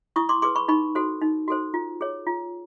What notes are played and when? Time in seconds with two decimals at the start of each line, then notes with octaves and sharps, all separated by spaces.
0.16 E4 C#6 D#6
0.29 C6 D6
0.42 G#4 B4 C6 D6
0.56 B5 C#6
0.68 D#4 B5 C#6
0.95 F#4 A4 C5
1.21 D#4
1.48 F#4 A4 C5
1.74 F4
2.01 G#4 C#5
2.27 F4